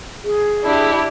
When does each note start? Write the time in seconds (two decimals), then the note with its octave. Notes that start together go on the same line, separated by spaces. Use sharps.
0.24 G#4
0.64 D4 E4 G4